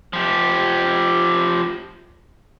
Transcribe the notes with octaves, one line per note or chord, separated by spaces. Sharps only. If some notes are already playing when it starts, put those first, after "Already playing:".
F3 G4